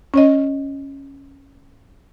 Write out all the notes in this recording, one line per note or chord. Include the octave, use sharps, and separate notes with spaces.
C#4 C#5 D#5